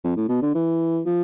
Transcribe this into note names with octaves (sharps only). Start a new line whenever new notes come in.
F2
A2
B2
D3
E3
F3